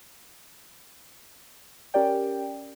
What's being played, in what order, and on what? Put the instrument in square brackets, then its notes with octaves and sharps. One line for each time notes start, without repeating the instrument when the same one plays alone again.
[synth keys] C#4 G4 A#4 D5 G5